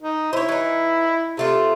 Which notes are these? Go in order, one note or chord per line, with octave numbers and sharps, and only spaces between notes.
D#4
E4 C5 C#5
E3 D#4
C3 A3 F4